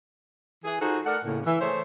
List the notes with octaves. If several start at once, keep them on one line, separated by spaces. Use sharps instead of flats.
E3 G#4
D#4 F4 F#4 G#4 A4 C5
A3 A4 A#4 D5 F#5
A2 C#3 A#3
E3 E5
A3 G#4 C5 C#5 E5